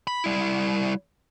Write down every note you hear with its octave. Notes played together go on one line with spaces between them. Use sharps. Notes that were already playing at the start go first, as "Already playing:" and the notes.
B5
G3 E4